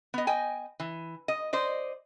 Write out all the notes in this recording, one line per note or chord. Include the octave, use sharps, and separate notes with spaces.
B3 D#5
D#5 G5 G#5
E3
D#5
C5 D5 D#5